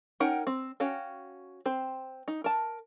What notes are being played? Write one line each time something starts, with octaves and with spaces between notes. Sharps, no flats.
C#4 D#4 A#4 F#5 G5
C4
C#4 F#4 F5 G5
C4 C5
D#4
A#4 A5